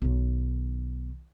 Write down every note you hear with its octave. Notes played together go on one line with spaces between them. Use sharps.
B1 D#3